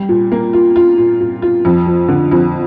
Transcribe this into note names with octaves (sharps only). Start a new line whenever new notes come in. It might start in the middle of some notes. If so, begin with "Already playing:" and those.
Already playing: G3
A#2
A#3
F4
F4
A#2
A#2
F4
F2
F3
D3
F2